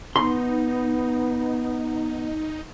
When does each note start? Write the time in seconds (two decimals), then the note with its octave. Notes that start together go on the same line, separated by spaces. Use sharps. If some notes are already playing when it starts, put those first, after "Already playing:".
0.16 B3 D#4 C6